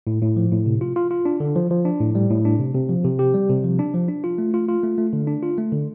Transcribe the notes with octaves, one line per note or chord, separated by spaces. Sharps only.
A2
A2
F3
A2
C3
F4
F4
F4
D4
D3
F3
F3
D4
A2
G3
A2
D4
C3
C3
F3
C3
G4
G3
C3
F3
D4
F3
D4
F4
A3
F4
F4
A3
A3
D3
D4
F4
A3
D3